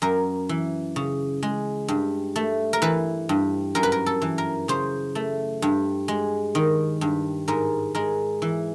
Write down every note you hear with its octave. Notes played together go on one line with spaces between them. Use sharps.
F#2 A#4
E3
C#3
G#3
G2
A3
A#4
E3 B4
G2
F#2 A#4
B4
A#4
A4
E3
A#4
C#3 C5
A3
G2
G#3
D#3
G2
G#2 A#4
G#3 A#4
E3